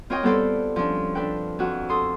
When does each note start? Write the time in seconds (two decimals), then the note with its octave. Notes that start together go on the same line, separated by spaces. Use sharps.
0.10 C4 F4 A#4 C#5 D#5 G5
0.23 G3 B3 C4 A4 C5 D5
0.76 F3 C#4 D4
1.15 D4 A4 B4 G5
1.59 F2 F#4
1.89 A4 C6 D#6